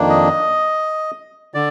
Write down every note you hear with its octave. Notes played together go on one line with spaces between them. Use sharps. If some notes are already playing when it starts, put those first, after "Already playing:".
Already playing: F2 D#3 A#3 D4
D#5
D3 D5